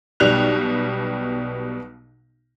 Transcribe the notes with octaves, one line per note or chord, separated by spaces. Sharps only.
B1 B2 G3 B3 F#6 F7